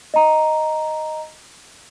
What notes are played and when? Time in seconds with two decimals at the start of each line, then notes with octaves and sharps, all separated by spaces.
0.14 D#5 A#5